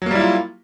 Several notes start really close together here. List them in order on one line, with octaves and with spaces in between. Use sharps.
F#3 A#3 G3 E4 F4